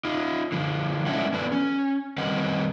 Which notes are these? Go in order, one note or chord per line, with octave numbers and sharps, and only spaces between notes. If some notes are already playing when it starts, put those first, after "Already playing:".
D#4 F4
D3 F3
G#3 C#4 D4 E4 E5 F#5
F3 B3 A4 B4 D5
C#4
D#3 G3 C4 B4 D#5 F#5